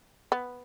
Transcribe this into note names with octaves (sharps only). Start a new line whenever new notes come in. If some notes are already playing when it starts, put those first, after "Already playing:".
B3